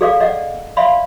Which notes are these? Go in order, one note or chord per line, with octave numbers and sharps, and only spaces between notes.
G#4 A4 D5 F5 D6
D5 D#5 F#5
D5 E5 F5 B5 C6